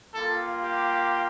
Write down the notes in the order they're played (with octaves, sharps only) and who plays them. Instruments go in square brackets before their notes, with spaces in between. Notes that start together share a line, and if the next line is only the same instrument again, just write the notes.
[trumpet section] G3 A#3 F4 A4
G4